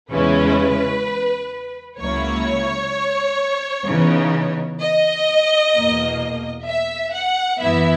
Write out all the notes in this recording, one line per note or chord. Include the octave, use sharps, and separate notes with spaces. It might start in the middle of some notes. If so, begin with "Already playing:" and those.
E2 C#3 G#3 C#4 E4 B4
C#2 C#3 F#3 A#3 E4 C#5
C#3 E3 B3 D#4
D#5
E2 B2 A#3
E5
F#5
F#2 E3 B3 E4 E5